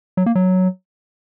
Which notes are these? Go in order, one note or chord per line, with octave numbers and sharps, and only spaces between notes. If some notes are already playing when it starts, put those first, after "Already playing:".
F#3
A#3
F#3